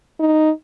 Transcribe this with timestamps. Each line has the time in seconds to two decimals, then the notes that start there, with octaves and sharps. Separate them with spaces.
0.20 D#4